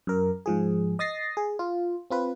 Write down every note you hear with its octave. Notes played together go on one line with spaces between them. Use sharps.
F#2 A#4
G#2 F3 G#4
D#5 D#6 A6 A#6 C7
G#4
F4
C4 F4 B4